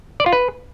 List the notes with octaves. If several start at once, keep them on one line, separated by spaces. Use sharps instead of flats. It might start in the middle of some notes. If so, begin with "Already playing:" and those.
D5
F4
B4